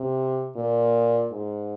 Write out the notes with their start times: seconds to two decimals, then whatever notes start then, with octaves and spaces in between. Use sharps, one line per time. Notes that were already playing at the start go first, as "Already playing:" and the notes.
Already playing: C3
0.56 A#2
1.32 G#2